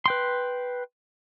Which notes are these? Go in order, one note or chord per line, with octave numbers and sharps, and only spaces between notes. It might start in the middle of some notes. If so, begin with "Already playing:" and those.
B4 G5 C6